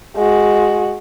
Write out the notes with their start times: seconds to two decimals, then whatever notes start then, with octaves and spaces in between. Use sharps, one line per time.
0.17 G#3 F#4